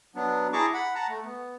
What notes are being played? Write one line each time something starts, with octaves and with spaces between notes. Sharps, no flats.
F#3 B3 D4
E4 G#4 A5 A#5 C#6 D6
F#5 B5
F#5 A5 A#5
A3
B3